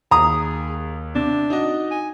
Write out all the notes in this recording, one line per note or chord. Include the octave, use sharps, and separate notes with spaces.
D#2 G#4 A#5 D#6
C3 D4
D#4 F#4 D#5
G#5